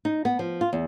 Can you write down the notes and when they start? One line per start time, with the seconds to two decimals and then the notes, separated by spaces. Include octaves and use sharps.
0.05 D#4
0.25 B3
0.39 F3
0.61 F4
0.73 E2